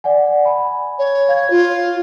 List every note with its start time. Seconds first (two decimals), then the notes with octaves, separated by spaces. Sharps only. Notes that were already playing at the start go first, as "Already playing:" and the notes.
0.04 D5 F#5 G#5
0.45 G#5 B5
0.98 C#5
1.28 F5 G#6
1.50 F4